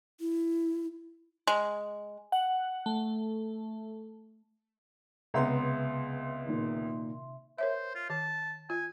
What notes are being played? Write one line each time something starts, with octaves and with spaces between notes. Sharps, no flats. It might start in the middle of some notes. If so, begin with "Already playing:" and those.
E4
G#3
F#5
A3
C#2 C3 B3 E5 A#5 C6
A#2 D#3
A#4 C5 C#5 E5
F4
D#3 A5
F4 G#5